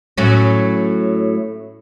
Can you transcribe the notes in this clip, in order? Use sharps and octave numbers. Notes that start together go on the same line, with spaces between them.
A2 F#3 C#4